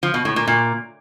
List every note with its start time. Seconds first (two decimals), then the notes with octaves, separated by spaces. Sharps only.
0.03 F3
0.14 B2
0.25 A2
0.36 A#2
0.48 A#2